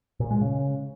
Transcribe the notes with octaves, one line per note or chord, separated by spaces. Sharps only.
A#2
G#3
C#3